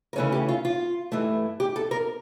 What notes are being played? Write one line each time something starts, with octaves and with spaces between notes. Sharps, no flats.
A#4
C#3 E3 A3 C#4 A4
G4
F4
F4
G2 E3 A3 E4
G4
A4
A#4